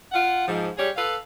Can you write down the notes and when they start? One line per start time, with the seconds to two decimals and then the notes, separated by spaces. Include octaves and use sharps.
0.12 F4 F#5
0.48 G#2 F3
0.77 G3 G4 G#4 C#5
0.96 A4 B4 F5